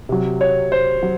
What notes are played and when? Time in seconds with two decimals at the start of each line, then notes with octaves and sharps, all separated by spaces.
0.09 C3 F#3
0.41 C#5
0.72 C5
1.03 F#3